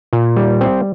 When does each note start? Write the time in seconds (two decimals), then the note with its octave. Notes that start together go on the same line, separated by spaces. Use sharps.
0.13 A#2
0.37 G3
0.61 C4